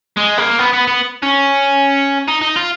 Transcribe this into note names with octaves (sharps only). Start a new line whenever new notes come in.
G#3
A#3
B3
B3
B3
C#4
D#4
D#4
F4